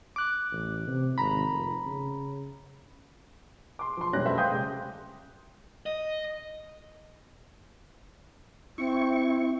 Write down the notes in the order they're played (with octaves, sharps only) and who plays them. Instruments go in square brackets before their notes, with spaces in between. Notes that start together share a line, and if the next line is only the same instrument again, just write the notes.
[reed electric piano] D6 F#6
[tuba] A1
C3
[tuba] G#1 [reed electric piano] A#5 B5
[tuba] F1
C#3
[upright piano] C6 D6
F3 C6
E1 F#2 G3 C#4 F#6 A#6
F#3 A3 A4 B4 C5 E5
F5 G5 C6 D#6 G6
C#3 G#3 G4 G#4
[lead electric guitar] D#5
[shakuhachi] C4 [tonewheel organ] E4 C#6